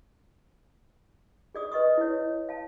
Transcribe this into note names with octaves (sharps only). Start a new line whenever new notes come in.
G#4 D5 D#6
B4 D#5 C#6 D#6
E4 C#5
F5 A5